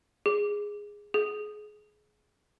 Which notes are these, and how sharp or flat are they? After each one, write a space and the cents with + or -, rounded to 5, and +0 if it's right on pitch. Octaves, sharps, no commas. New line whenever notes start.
G#4 -10
G#4 +25